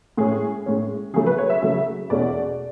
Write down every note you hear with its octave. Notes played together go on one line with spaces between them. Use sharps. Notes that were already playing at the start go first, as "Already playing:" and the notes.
A2 G#3 C#4 G#4
A2 G#3 C#4
C#3 F#3 A3 G#4
B4
C#5
E5
C#3 F#3 A3 E5
E2 B2 A3 C#4 D5